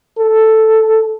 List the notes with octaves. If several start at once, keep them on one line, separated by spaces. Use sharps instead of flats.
A4